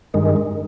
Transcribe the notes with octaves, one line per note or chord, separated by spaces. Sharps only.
G2 D#3 G#3